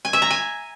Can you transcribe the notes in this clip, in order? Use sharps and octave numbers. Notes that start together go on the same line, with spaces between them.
G#5
E5
A#5
G#5